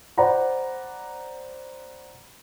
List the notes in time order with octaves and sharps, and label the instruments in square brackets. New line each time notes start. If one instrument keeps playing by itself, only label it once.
[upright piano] C5 D5 F#5 A#5 B5